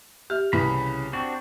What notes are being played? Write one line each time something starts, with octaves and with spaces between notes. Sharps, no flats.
G4 E5 F6
C2 C#3 E3 B5
C4 D4 F#4